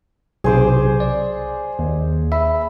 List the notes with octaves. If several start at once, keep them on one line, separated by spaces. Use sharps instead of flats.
B1 C3 G#4 C5 D6
D5
D#2
E5 B5